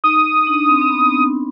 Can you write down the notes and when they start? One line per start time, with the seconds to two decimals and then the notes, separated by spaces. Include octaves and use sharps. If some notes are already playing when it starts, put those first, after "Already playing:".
0.04 D#4 D#6
0.47 D4
0.69 C4
0.81 C4
0.90 B3